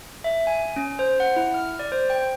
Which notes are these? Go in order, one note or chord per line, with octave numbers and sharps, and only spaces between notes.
E5
G#5
C#4
C5
F#5
E4
F6
D5
C5
G5